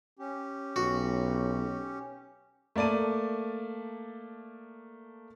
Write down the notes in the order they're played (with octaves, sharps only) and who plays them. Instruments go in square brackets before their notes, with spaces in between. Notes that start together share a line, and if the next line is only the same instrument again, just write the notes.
[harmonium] C#4 G4
[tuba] B1 [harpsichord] F#4
[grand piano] A3 A#3 D5 A5 D#7